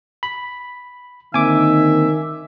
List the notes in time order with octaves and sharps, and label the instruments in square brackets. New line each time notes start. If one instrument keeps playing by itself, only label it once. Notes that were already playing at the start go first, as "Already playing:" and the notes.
[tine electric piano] B5
[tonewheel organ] D3 A#3 C4 [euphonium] D#3 [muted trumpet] E5 [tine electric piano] G#5 D6